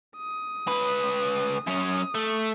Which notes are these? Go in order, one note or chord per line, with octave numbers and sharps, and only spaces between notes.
D#6
C#2 B4
F#2 C#4 D#6
A3